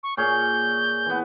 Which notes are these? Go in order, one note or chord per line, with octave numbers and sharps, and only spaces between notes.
C#6
A#2 G#4 C#5 G6
E3 B3